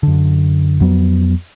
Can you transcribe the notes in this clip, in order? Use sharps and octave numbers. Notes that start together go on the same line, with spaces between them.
F#2 D3
F2 F#3 B3